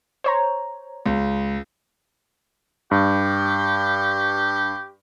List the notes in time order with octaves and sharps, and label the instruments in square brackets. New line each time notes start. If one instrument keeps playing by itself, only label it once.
[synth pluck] C5 C#5 A#5
[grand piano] C#2
[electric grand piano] G2 [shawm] G4